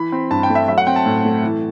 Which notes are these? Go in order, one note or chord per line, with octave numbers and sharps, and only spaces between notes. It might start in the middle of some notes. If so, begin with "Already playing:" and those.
Already playing: E3 B5
C4
G2 A5
G5
A3
E5
F#3 E5
F#5
C4 G5
A5
A2
A3
E3